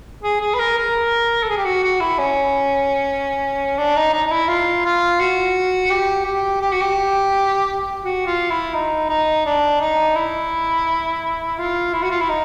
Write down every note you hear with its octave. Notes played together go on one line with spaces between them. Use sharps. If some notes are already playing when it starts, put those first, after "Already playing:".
G#4
G#4
B4
A#4
A#4
A4
G#4
G4
F#4
F#4
E4
C#4
D4
D#4
D#4
D#4
E4
F4
F4
F#4
G4
G4
G4
F#4
G4
F#4
F4
E4
D#4
D#4
D4
D#4
E4
F4
E4
F#4
F4
E4
D#4